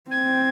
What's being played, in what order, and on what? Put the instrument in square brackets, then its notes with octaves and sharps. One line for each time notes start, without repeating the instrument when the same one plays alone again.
[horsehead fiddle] C4 [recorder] G#6